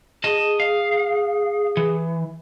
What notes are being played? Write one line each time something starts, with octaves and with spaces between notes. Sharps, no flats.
G#4 D#5 A5
F5
E3